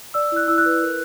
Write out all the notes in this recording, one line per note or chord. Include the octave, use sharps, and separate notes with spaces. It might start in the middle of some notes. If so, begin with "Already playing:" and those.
D5 E6
E4 F#6
E4 E6
F#6
B4
A#4